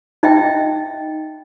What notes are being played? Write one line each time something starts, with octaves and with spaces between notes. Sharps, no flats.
D#4 D#5 E5 G5